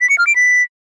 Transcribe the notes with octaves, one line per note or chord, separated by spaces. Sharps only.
B6
C#7
F6
D7
B6